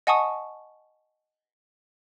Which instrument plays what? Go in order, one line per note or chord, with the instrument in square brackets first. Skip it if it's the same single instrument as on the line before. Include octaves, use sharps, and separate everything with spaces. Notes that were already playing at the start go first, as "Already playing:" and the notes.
[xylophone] D#5 F#5 G#5 A5 C#6 D#6